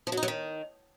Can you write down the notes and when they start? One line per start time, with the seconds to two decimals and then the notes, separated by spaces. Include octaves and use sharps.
0.07 F3
0.12 F#3
0.17 D#4
0.23 F#3
0.28 D#3